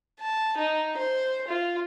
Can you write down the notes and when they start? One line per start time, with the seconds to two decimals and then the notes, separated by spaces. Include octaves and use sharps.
0.20 A5
0.57 D#4
0.97 C5
1.48 F4